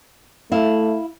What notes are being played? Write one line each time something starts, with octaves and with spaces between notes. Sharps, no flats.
A3 E4 F5